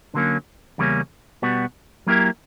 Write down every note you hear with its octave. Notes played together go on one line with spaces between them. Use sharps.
D3 F#3 A#3 C#4
E2 C#3 G3 A#3 C#4
B2 G3 B3 F#4
F#3 A#3 E4 G4 A#4